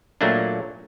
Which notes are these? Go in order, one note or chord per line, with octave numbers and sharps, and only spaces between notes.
A#2 F#3 A3 A#3 D4